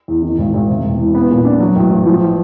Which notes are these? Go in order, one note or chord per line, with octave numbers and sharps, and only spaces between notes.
E2
D#3
G#1
G#1
C3
E1
E3
B3
A#2
D4
F#3
A1
A1
F3